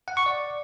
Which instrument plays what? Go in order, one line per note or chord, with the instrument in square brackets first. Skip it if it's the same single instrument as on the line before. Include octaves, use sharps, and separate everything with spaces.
[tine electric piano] F#5
C#6
D5